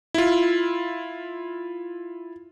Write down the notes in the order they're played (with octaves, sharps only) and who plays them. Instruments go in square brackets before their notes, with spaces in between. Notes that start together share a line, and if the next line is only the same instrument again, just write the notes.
[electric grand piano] E4 F4